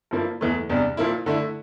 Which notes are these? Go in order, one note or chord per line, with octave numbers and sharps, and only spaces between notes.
G2 F3 A#3 E4
E2 E3 A3
E2 C3 G3 D4
A#2 F3 A#3 E4
D3 A3 E4